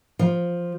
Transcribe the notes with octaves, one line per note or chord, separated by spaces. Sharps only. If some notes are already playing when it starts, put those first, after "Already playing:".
F3